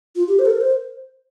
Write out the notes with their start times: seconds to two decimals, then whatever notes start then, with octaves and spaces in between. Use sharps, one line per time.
0.16 F4
0.28 G4
0.39 C5
0.45 A4
0.50 A#4
0.61 C5